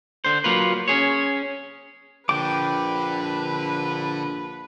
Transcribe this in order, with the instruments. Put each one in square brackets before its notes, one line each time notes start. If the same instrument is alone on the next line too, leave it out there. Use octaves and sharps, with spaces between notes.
[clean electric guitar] D3 C5
F#3 A#3 F4 B4
C#4 G#4 C#5
[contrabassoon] A#1 [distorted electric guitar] D3 [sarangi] B4 [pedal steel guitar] G5 D6